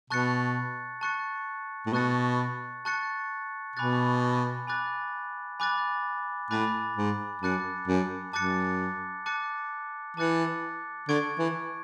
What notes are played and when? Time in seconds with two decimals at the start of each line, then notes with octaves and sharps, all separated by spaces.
0.10 B2 A5 C#6 F#6 A6 C#7
1.01 A5 C#6 F#6 A6 C#7
1.86 A2
1.93 B2 A5 C#6 F#6 A6 C#7
2.85 A5 C#6 F#6 A6 C#7
3.76 B2 G#5 B5 D6 F#6 A6
4.67 G#5 B5 D6 F#6 A6
5.60 G#5 B5 D6 F#6 A6
6.51 A2 G#5 B5 D6 F#6 A6
6.97 G#2
7.42 F#2 A5 D6 F#6 A6 C#7
7.88 F#2
8.33 F#2 A5 D6 F#6 A6 C#7
9.26 A5 D6 F#6 A6 C#7
10.17 E3 A5 D6 F#6 A6 C#7
11.09 D3 C#6 G#6 D7
11.39 E3